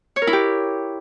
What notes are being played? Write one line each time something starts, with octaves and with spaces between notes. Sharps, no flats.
C#5
A#4
E4
G4